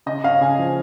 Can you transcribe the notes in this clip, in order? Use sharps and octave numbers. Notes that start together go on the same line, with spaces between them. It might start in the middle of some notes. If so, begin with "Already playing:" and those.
C#3 D#5
C#4 F5
C#3 G#5
F3